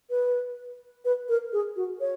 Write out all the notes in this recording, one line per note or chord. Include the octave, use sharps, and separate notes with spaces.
B4
B4
A#4
G#4
F#4
C#5